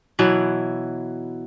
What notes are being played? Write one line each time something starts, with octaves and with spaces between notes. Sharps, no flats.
B2 E3 F#3 E4